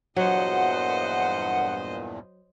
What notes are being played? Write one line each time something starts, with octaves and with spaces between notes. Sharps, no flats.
E2 G2 A#2 F#3 C5 D#5 F#5